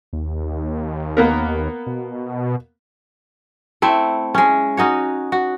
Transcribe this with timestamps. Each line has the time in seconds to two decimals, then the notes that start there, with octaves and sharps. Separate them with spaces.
0.13 D#2
1.17 A#3 B3 A#4
1.87 B2
3.82 A3 C4 E4
4.35 G#3 C#4
4.77 C#4 D#4 F#4 C#5
5.32 F#4